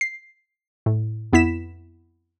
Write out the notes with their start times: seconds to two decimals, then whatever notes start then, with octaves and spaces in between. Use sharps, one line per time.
0.01 C7
0.86 A2
1.33 F2 B3 E4 B6 E7